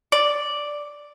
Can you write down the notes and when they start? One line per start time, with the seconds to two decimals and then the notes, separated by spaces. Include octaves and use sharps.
0.12 D5